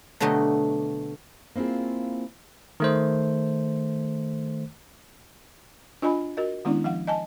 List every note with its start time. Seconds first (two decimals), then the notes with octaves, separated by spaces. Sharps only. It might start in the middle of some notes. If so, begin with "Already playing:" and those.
0.20 B2 D3 F#3 A3 G4 D#5
1.56 A#3 C4 E4 F4 G#4
2.80 D#3 A3 C5
6.02 D4 F4 D#5 G#5 B5
6.37 F#4 A#4 D#5
6.65 D#3 G#3 B3 C#4 D4 E4
6.84 F3 F5 F#5
7.07 D#5 G#5 A5